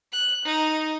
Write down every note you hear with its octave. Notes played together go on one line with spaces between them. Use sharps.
F#6
D#4